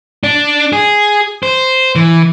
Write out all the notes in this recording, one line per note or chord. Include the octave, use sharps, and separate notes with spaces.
D4
G#4
C5
E3